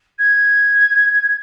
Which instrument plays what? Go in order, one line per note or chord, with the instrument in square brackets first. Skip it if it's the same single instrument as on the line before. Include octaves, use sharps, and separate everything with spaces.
[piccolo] G#6